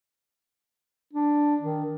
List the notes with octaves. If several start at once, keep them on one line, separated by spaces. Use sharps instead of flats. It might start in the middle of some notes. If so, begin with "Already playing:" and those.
D4
D#3